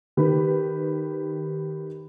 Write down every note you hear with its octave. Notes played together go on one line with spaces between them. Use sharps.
D#3 G4 B4